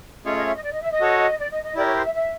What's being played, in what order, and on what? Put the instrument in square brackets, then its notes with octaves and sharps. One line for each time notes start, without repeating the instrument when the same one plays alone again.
[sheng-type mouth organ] A3 C#4 F4 G#4 C#5 [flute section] D#5
[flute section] D#5
E5
D#5
D5
D#5
E5
D#5
[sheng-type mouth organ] F#4 A4 C#5
[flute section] D5
D#5
D#5
[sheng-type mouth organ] E4 G4 A#4 [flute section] D5
[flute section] C#5
C5
E5
E5